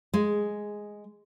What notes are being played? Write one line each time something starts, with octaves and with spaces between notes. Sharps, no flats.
G#3